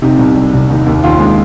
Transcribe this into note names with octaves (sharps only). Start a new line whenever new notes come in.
C3 D#4
C2
G3
C2
D#2 D#4
D#2
D#2 F4
G#3